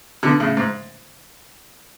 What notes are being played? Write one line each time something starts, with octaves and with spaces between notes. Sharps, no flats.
B2 D3
A2 C#3
G#2